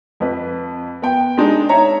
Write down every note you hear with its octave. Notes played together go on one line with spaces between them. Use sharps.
F2 B4
B3 G5
G#3 D4 D#4
C#5 E5 A#5